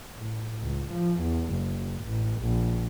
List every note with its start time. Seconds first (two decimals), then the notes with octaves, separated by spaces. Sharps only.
0.15 A2
0.62 C#2
0.91 F3
1.21 E2
1.50 F#1
2.04 A1
2.40 A#1